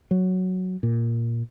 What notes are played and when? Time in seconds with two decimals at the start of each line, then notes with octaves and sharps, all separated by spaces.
0.11 F#3
0.83 A#2